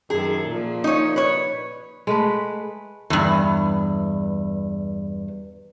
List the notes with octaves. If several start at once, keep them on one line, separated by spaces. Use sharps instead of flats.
F#2 D#3 G#4 A4
A#2 F3
D#4 C#5
B4 C#5
G#3 A3 B4
E2 G2